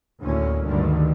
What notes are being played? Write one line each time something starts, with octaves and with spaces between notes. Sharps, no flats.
D2 A2 A#3 C#4
D2 G2 D3 D#3